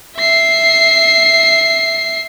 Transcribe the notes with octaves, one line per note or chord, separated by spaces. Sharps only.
E5 C7